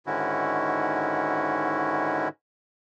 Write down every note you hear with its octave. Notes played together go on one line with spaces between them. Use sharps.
G#2 D3 D#3 C#4 E4 F#4